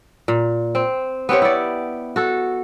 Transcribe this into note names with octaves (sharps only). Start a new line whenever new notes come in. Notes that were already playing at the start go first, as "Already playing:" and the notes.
A#2
C4
B3 C4 G4 C#5
E4 D5
F#4 A4